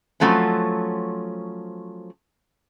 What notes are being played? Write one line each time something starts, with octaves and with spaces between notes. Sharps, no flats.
F3 F#3 A3 C4 C#4